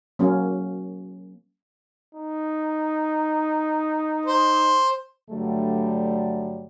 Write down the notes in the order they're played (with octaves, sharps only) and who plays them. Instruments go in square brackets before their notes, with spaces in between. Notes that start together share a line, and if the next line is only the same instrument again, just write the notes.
[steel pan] F#3 A#3 C#4
[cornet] D#4
[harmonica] C5
[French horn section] G2 D3 F#3 G3 A3